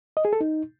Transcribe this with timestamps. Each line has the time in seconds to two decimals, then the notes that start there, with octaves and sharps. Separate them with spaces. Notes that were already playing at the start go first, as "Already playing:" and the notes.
0.17 D#5
0.25 G#4
0.33 A4
0.41 D#4